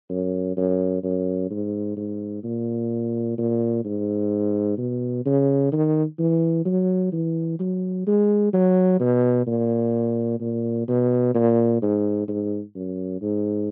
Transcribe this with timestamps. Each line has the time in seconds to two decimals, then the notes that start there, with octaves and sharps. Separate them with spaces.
0.10 F#2
0.57 F#2
1.03 F#2
1.51 G#2
1.97 G#2
2.43 A#2
3.38 A#2
3.85 G#2
4.78 B2
5.25 C#3
5.72 D#3
6.19 E3
6.66 F#3
7.12 E3
7.59 F#3
8.07 G#3
8.53 F#3
9.00 B2
9.47 A#2
10.40 A#2
10.88 B2
11.34 A#2
11.82 G#2
12.28 G#2
12.76 F#2
13.22 G#2